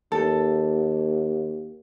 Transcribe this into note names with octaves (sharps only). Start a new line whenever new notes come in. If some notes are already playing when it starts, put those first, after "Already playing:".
D#2 A4